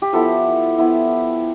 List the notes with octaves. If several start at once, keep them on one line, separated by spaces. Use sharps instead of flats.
G4
F3 B3 E4 A4
F3 B3 E4